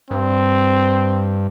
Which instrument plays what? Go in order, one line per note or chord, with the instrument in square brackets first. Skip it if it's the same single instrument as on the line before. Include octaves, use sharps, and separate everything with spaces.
[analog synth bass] G2 [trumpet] C4